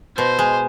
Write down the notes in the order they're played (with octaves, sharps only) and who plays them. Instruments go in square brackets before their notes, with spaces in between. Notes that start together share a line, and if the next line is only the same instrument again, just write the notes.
[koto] B2 [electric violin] C5
[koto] G#3